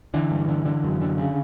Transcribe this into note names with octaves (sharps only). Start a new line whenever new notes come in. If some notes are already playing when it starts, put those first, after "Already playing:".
D3 E3
G2
D3
D3
F#2
D3
C#3